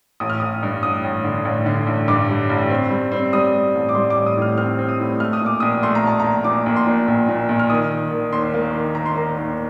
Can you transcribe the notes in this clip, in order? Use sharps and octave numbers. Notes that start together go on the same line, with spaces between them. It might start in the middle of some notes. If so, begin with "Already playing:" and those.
A1 D#6
F6
A1 D#6
G2
A1 D#6
A1
D3
A1
D3
A1
G2 D6
G3
A1
C4
G3
C4
G3 D#6
G3
A1
D6
G3 C6
D6
A1
D#6
A2 F6
C4 F6
C4
D#6
A2
A3 F6
D#6
A#2 D6
A#1 D#6
A3 C6
A#5
A#1 A5
A#1 A#5
A#2 D6
A#1
C6
A#2
A#1
A#2
A#1
F6
D#3 D#6
D#3
D#3
D#2 C6
A#3
D#3
D#3 A#5
C6
A#3 A#5
D#2